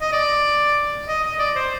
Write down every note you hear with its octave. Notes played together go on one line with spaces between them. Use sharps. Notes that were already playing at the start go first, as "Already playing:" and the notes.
D#5
D5
D#5
D#5
D5
C5